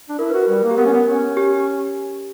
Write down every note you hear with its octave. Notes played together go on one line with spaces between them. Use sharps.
D4
E4 A#4
F#4 B4
A#4
G3
A#3
G4
B3 A#4
C#4
B3
C#4
G4